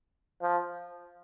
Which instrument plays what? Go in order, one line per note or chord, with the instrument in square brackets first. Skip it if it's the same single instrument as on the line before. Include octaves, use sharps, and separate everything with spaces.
[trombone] F3